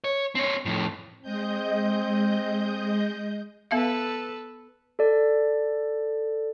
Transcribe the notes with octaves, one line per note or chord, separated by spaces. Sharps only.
C#5
C4 C#5
F2 A2
G#3 C4 D#5 G6
B3 A4 B4 E5 F5
A4 D5